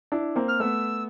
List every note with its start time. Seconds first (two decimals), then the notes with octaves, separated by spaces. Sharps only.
0.12 D4 E4
0.36 A#3 C4
0.47 F6
0.60 A3 B3 E6